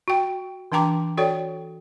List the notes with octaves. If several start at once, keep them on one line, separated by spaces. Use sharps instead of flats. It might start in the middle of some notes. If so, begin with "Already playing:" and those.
F#4 G5
E3 D4 G5 A#5 D6
F#4 A4 C#5 D5 G5